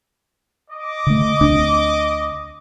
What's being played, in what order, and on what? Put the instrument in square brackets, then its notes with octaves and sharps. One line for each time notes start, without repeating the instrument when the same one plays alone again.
[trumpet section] D#5 D6
[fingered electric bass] D3 A3
D2 C4 D4